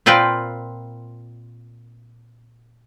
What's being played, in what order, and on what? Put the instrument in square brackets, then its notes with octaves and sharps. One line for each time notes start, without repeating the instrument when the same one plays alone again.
[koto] A#2 C4 F4 B4 F5 G5